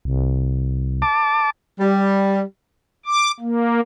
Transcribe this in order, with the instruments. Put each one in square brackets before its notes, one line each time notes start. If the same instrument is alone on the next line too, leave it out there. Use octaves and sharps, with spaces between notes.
[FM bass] C2
[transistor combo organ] A5 D6
[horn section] G3
[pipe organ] D6
A#3